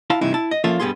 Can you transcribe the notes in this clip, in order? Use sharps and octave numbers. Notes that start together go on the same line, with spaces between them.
E4 F5 A5
G2 C3 E3 D#4 E4
E4 A5
D#5
F3 A#3 C#4 F4 A4 E5
G2 G3 B3 G#4 C6